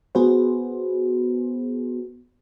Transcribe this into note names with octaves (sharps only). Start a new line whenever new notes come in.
B3 F#4 G#4 B4 C5